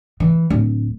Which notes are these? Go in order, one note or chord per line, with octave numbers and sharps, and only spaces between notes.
E3
D1